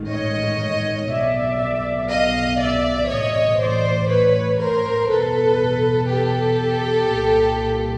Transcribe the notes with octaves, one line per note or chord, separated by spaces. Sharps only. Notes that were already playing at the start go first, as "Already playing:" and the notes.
Already playing: A1 G#2 D#3
C#5 D#5
B1 B2 D5 E5
D#5 F5
D5 E5
A1 A2 E3 C#5 D#5
C5 D5
B4 C#5
A#4 C5
E2 B2 A4 B4
G4 A4
C2 A#2